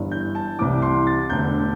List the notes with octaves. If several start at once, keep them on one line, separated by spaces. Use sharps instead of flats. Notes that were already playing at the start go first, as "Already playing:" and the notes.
Already playing: G1 G2 E3
G6
A5
C2 C3 E3 D6
C6
A6
E1 D2 D3 G6